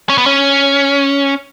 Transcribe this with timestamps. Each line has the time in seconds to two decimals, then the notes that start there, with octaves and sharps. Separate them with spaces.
0.09 C#4
0.18 B3
0.26 C#4